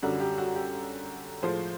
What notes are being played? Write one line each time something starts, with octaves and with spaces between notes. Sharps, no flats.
F#2 D3 G3 F#4
G4
F#4
G4
A2 F3 G#3 C5